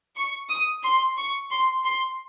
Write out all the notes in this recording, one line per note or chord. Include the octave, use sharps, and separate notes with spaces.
C#6
D#6
C6
C#6
C6
C6